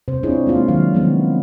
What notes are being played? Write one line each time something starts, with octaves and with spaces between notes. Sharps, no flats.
C3 C5
C4 D4 E4 F4 G#4 C#5
G#3 A#3 F4
D#3 F#3 F5
D#3 F3 F#3 G#3 B3 C4